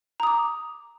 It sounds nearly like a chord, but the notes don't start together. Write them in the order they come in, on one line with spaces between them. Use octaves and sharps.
A#5 D#6 D6